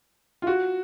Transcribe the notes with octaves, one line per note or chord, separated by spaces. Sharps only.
F4
F#4